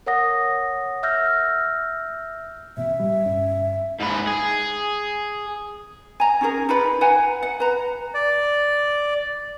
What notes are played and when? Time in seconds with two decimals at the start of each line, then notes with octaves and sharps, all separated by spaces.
0.06 A#4 C#5 F#5 D#6 A#6
1.03 E5 E6 F6 G6 A#6
2.77 A1 B2 E5
3.00 G3
3.25 G1 C#4
4.00 G#2 B4
4.27 G#4
6.20 G#5 A#5
6.41 C#4 D#4 G#4 A#4
6.69 D#4 F4 B4 B5
7.01 B4 F#5 G#5 A#5
7.43 F#5
7.60 B4 A#5
8.14 D5